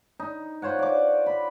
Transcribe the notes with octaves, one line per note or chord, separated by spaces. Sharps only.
D#4
F4 C5 C#5 F#5
D5 D6
B5